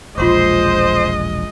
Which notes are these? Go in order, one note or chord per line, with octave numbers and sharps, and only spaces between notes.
E1 A#1 G#3 F4 C5 D#5 C6 D6